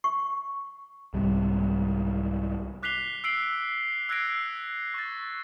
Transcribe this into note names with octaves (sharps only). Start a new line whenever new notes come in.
C#6
C2 G#2 G3
D6 F#6 B6 C7 F7 G7
E6 C7 D7 F#7
E6 F#6 G#6 A#6 C7 D7
C#6 A6